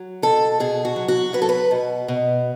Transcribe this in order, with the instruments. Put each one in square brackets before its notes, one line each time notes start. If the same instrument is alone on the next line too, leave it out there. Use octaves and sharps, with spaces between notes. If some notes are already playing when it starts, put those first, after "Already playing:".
Already playing: [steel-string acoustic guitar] F#3
B2 A4
B2 G#4
F#4
F#3
F#4
F#3 B4
A4
B4
B2
B2